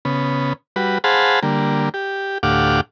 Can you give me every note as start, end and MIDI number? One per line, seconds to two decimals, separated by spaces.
0.05 0.53 49
0.05 0.53 59
0.76 0.98 55
0.76 0.98 66
0.76 0.98 71
1.04 1.40 68
1.04 1.40 72
1.04 1.40 77
1.04 1.40 78
1.04 1.40 81
1.04 1.40 83
1.43 1.89 50
1.43 1.89 55
1.43 1.89 58
1.94 2.38 67
2.43 2.81 38
2.43 2.81 45
2.43 2.81 67
2.43 2.81 77
2.43 2.81 78
2.43 2.81 86